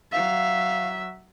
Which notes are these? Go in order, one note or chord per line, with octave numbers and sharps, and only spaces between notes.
F#3 E5 F5